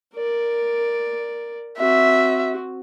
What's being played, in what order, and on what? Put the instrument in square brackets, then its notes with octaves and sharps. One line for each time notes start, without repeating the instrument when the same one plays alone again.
[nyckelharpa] A#4 D5
[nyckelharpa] C4 F#4 [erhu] E5